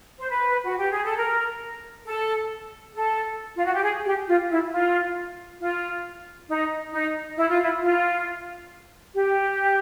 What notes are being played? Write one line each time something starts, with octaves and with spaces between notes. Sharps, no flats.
C5
B4
F#4
G4
G#4
A4
A#4
A4
A4
F4
F#4
G4
G#4
G4
F4
E4
F4
F4
D#4
D#4
E4
F4
E4
F4
G4